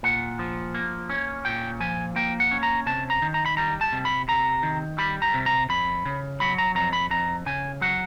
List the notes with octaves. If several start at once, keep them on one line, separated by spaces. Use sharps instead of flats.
A#2 F#5
F3
A#3
C#4
A#2 G5
F3 G#5
A#3 G5
F#5
C#4
A#5
C3 A5
A#5
D#3
A#5
B5
G3 A#5
A5
C3
B5
C3 A#5
D#3
G3 B5
A#5
C3
A#5
F2 B5
C#3
F#3 B5
A#5
F2 A#5
B5
F2 A#5
C#3 G#5
F#3 F#5